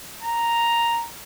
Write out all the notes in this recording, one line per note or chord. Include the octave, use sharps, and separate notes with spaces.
A#5